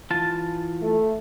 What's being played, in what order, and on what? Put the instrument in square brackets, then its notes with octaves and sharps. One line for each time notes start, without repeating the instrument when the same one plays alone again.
[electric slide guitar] E3 F4 A5
[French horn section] A3